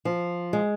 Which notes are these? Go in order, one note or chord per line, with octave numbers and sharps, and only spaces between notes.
F3
G#3